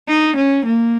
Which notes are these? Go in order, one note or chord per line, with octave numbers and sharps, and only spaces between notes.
D#4
C#4
A#3